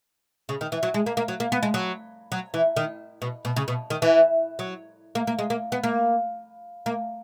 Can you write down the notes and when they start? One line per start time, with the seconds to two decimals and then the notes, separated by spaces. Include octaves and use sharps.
0.49 C#3
0.61 D#3
0.72 E3
0.83 F#3
0.94 G#3
1.06 A#3
1.17 A#3
1.28 F#3
1.40 A#3
1.52 B3
1.63 G#3
1.74 F#3
2.32 F#3
2.54 E3
2.76 D#3
3.22 B2
3.45 B2
3.56 C#3
3.68 B2
3.90 D#3
4.02 E3
4.59 F#3
5.15 A#3
5.27 A#3
5.39 G#3
5.50 A#3
5.72 B3
5.84 A#3
6.86 A#3